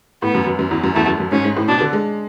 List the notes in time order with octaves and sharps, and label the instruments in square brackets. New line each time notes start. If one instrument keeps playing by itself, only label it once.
[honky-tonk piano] A2 [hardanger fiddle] B3
[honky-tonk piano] F#2
F#2
F#2
E2
F#2
[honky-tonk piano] E2 [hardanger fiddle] A3
[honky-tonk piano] F#2
F#2
[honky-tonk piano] G#2 [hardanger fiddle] C#4
[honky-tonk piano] G#2
A2
[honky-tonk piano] B2 [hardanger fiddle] D4
[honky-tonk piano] D3
G#3